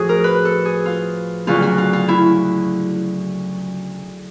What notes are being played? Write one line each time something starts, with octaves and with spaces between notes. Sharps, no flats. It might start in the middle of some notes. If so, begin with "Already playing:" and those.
Already playing: A2 F3 F#4 G#4
A#4
B4
A4
G#4
F4
D2 C#3 F#3 F4
F#4
F4
F4
E4